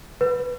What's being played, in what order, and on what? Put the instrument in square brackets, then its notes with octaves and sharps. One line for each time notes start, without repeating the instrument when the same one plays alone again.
[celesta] B4